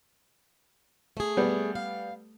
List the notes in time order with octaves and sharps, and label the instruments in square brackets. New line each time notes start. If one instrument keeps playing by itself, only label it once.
[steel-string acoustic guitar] A3 G#4
[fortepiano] G3 B3
[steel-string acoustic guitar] F5